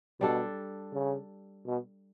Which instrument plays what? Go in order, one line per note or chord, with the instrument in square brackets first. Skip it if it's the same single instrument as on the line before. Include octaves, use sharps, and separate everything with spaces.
[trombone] B2 [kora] G3 D4 A4
[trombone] C#3
B2